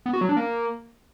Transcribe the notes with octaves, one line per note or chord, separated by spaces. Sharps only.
B3
F#4
F#3
D4
A#3